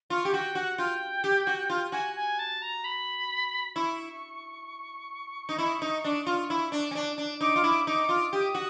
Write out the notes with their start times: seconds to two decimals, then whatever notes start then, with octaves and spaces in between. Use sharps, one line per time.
0.10 F4 C#6
0.25 G4
0.33 F#4 G5
0.55 F#4 F#5
0.78 F4 G5
1.24 G4
1.47 F#4
1.70 F4
1.92 F#4 G#5
2.16 G#5
2.39 A5
2.62 A#5
2.84 B5
3.75 E4 C#6
5.49 D#4
5.58 E4
5.82 D#4
6.04 D4
6.26 F4
6.50 E4
6.72 D4
6.91 C#4
6.95 D4
7.18 D4
7.41 D#4 D6
7.56 F4
7.64 E4
7.87 D#4 D6
8.09 F4
8.32 G4 D#6
8.55 F#4